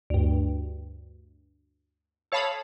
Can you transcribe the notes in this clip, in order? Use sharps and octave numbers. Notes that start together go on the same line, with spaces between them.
D2 G2
A4 C#5 F5 A5 B5 D#6